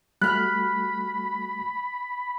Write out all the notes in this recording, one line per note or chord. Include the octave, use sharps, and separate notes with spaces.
G3 A3 F#4 B5 F6 F#6